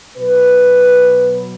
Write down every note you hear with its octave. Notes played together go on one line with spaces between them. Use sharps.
B2 F#3 B4